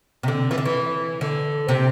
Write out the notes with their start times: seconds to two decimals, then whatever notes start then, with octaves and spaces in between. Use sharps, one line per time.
0.23 C3
0.28 D3
0.51 E3
0.58 D3
0.65 E3
1.21 D3
1.68 C3